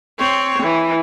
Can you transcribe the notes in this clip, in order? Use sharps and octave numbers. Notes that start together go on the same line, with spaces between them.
C4 C#5
E3